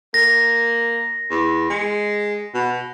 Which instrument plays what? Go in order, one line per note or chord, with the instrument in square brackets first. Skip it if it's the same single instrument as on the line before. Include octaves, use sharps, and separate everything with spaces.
[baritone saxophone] A#3 [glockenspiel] A#6
[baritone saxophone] E2
G#3
B2